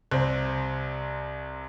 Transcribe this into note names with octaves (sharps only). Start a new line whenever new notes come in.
C2 C4